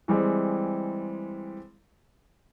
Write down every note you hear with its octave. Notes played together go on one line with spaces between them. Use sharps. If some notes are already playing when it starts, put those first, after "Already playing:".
E3 G3 G#3 C4